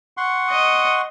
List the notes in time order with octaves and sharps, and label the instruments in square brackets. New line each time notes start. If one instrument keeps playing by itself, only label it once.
[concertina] F#5 C6 C#6
[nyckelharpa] D#5